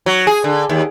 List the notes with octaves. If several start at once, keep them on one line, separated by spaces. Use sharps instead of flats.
F#3
G#4
D3
D#2